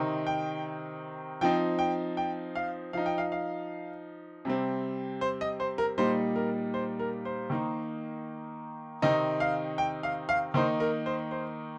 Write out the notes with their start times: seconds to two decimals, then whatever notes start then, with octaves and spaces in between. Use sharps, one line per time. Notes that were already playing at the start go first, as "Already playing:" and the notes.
Already playing: C3 D#3 C4 D#4
0.27 G5
1.41 F3 C4 D#4 G5
1.79 G5
2.17 G5
2.55 F5
2.93 F3 D#4 F5
3.06 G5
3.18 F5
3.32 F5
4.45 C3 G3 C4
5.21 C5
5.41 D#5
5.60 C5
5.78 A#4
5.98 A#2 G3 A#3 D#4 C5
6.36 A#4
6.74 C5
6.99 A#4
7.25 C5
7.50 D#3 A#3 D#4
9.02 C3 D#3 C4 D#4 D#5
9.40 F5
9.78 G5
10.03 F5
10.29 F5
10.54 D#3 A#3 D#4 C5
10.80 A#4
11.06 C5
11.31 C5